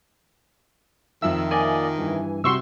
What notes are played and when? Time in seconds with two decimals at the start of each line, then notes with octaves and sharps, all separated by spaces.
1.22 F2 D#3 E5 E6
1.51 A#3 D5 D#5 G#5
1.98 G2 E3
2.44 C3 G3 F#4 C6 C#6 E6